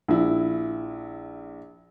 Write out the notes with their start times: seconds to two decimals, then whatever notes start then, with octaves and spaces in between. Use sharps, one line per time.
0.08 A#1 E4